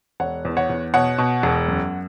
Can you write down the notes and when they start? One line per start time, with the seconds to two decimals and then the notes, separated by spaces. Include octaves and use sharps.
0.20 E1 C#5 F#5
0.45 E2
0.57 C#5 F#5
0.70 E2
0.94 B2 C#5 F#5
1.18 B2
1.43 E1
1.68 F#2